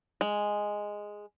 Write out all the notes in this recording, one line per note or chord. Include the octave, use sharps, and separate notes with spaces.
G#3